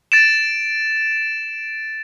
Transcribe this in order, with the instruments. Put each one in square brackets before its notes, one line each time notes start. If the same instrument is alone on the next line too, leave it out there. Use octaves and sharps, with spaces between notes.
[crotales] A6 D7 E7